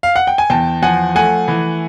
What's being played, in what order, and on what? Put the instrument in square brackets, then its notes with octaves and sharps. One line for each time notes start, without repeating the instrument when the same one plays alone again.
[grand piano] F5
F#5
G5
G#5
E2 G5 A5
F3 F#5 G#5
A3 F#5 G#5
E3